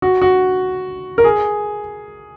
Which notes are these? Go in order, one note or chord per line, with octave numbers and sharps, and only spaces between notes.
F#4
F#4
A#4
G#4